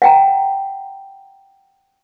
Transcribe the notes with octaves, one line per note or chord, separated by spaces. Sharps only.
F#5 G5 A#5